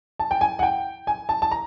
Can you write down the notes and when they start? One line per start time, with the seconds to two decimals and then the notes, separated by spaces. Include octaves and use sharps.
0.19 A5
0.31 G5
0.41 G#5
0.59 F#5
0.63 G5
1.07 G#5
1.29 A5
1.42 A5
1.51 A#5